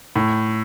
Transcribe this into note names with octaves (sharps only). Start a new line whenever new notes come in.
A2